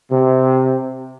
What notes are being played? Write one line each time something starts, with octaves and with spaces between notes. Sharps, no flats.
C3